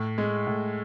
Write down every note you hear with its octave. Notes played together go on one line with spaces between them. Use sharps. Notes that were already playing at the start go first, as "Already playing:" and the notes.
Already playing: A2
G#3
A2